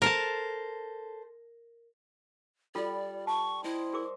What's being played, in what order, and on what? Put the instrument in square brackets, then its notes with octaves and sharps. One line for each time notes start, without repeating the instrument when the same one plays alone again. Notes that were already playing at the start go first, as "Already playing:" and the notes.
[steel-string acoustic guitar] A4 C5 [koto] A#4 A5
[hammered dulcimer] G3 [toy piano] F4 A4 [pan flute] D5
[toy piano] A5 [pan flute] C#6
[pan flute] E4 [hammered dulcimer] C5 D#5
[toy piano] G#4 A#4 D6